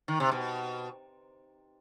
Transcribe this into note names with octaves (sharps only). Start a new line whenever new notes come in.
D#3
C3
B2